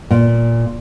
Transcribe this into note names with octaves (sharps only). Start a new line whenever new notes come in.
A#2